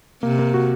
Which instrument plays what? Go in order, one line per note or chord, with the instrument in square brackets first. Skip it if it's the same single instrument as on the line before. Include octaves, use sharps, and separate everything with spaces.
[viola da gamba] C3 [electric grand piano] A#3
[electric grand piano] A#3
F#4